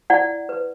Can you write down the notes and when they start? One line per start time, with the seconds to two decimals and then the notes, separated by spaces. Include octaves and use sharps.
0.10 E4 D5 F#5
0.49 B4